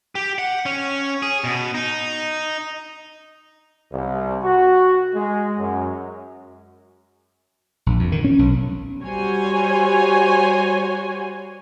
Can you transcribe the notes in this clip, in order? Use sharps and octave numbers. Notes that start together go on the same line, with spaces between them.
G4
F#5
C#4
G#4
B2
D#4
C2
F#4
G#3
F#2
A#1
F2
D#3
C#4
B1
G3 F#4 C5 C#5 G#5